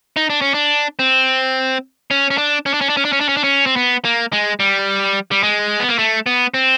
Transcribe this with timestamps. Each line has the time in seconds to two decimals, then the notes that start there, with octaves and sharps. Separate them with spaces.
0.17 D#4
0.30 D4
0.41 C#4
0.54 D4
0.99 C4
2.11 C#4
2.31 C#4
2.38 D4
2.66 C#4
2.74 D4
2.81 C#4
2.90 D4
2.97 C#4
3.05 D4
3.13 C#4
3.20 D4
3.29 C#4
3.37 D4
3.44 C#4
3.66 C4
3.76 B3
4.05 A#3
4.32 G#3
4.60 G3
5.31 G3
5.43 G#3
5.80 B3
5.89 A#3
5.98 A3
6.26 B3
6.54 C4